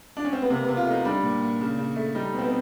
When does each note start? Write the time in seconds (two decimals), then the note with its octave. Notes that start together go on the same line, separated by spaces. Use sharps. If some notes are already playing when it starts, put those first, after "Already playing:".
0.17 D4
0.25 C#4
0.33 C4
0.42 B3
0.49 C3 A#3
0.63 B3
0.68 C3
0.77 F4
0.86 A3 D#4
1.05 G3 D4
1.23 A#2
1.42 A#2
1.61 C#3
1.78 C#3
1.96 A3
2.15 G3 D#4
2.33 B2
2.39 C4
2.42 B3